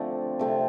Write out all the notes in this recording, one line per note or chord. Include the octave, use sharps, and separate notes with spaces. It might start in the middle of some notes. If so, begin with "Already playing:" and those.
Already playing: D3 F3 A3 C4
C3 A3 C4